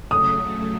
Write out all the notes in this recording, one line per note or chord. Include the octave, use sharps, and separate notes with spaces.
C#3 F#3 A3 D#6